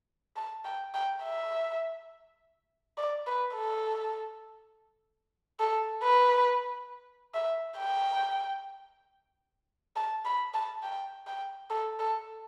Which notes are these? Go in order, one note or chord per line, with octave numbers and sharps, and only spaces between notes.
A5
G5
G5
E5
D5
B4
A4
A4
B4
E5
G5
A5
B5
A5
G5
G5
A4
A4